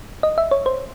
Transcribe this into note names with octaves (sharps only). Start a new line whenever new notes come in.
D#5
E5
C#5
C5